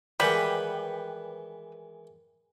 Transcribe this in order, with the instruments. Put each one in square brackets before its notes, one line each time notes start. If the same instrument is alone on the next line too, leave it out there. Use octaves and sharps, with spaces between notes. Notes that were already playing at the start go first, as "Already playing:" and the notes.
[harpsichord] D#3 E3 G#3 [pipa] G3 [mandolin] B4 F#5 G5